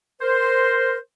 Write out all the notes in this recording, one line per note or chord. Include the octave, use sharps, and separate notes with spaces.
A#4 C5